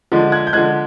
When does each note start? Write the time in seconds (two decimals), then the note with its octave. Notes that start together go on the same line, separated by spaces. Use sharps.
0.12 D3 F3 G#3
0.32 F#6 G#6
0.47 G6
0.53 D3 F3 G#3 F#6 G#6